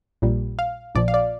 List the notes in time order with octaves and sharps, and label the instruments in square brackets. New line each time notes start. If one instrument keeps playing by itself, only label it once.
[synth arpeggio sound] A#1 A#2 G3
F5
A#1 A#2 F3 D5
F5
D5